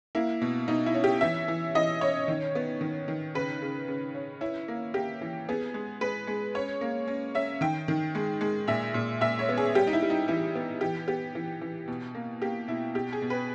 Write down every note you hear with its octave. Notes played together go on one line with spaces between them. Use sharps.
A#3 E4
B2
B2 D#4
E4
C#4
G4
E3 E5
E3
E3 D#5
C#4 C#5
D#3
B3
D#3
D#3
C#3 B4
C#3
C#3
C#4
C#4 E4
A#3
A#3 G4
E3
B3 G#4
G#3
G#3 B4
G#3
C#4 C#5
A#3
C#4
C#4 E5
D#3 G5
D#3
G#3
G#3
A#2 E5
A#2
A#2 E5
C#5
B3
G#4
G3 G4
D#4
E4
G3
D#4
E3 E4
B3
E3 G4
B3 G4
E3
E3
B2
A#3
A#3 G4
B2 E4
B2 G4
G#4
B2
B4